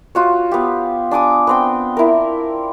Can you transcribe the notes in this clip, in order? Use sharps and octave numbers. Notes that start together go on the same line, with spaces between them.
F4 F#4 C#5
B3 G4
D4 G#5 D6 D#6
B3 C4 G5
E4 A#4